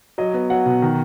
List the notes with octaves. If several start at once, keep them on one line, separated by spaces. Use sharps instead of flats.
F#3 D#5
B3
F#3 F#5
B2
D#3